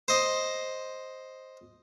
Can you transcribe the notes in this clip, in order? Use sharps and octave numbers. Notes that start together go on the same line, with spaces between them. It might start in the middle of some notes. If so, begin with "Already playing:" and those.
C5 D#5